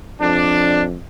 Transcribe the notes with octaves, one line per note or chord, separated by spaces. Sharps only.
F2 D4